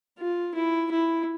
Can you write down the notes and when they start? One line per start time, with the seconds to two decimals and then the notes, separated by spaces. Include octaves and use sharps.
0.18 F4
0.55 E4
0.91 E4